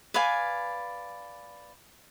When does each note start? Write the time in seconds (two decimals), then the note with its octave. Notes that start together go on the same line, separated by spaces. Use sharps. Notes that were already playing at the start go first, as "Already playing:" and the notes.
0.14 B4 D5 F5 G#5